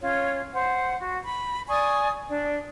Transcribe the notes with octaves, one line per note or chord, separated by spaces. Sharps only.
C#4 F4 C#5
C5 F#5
F#4
B5
D5 G#5 C#6 D#6
D4 D5